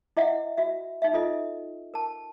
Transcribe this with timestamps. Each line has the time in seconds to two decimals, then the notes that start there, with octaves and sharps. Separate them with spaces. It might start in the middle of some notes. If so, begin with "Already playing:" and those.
0.17 E4 D#5 E5 F#5
0.58 F#4 E5
1.02 D#4 E5
1.14 F4 A4 D#5
1.94 A#4 A5